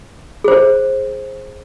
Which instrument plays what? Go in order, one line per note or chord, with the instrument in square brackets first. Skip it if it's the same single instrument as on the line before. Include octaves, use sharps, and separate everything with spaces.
[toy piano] G#4 C5